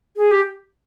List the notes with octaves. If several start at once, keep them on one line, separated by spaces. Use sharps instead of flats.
G#4
G4